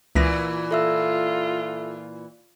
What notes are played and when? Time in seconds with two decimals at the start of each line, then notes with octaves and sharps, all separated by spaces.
0.15 C#2 A#2 E3 A#6
0.71 F4 A4 E5 E6